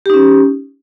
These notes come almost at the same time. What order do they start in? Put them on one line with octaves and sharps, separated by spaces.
G4 D#4 C#4